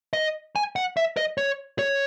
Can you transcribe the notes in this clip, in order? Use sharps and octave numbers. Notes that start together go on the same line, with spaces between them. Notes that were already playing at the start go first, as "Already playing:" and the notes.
D#5
G#5
F#5
E5
D#5
C#5
C#5